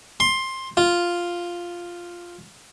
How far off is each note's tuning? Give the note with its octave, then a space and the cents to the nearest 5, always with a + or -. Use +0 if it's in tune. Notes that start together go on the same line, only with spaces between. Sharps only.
C6 +15
F4 +0